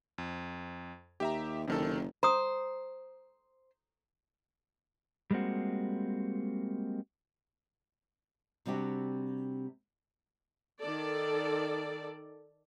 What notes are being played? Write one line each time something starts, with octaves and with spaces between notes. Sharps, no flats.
F2
D#2 G4 E5 A#5
F#1 C3 D#3 A4
C5 A#5 D#6
G3 G#3 A#3 C4 F#4
C3 G3 C4 D4 F#4 G4
D#3 A4 D5